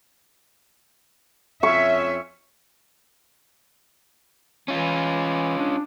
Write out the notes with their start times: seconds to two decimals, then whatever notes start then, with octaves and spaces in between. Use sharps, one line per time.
1.63 F2 C#4 C#5 E5 C#6
4.68 E3 C#4 F4
5.58 D4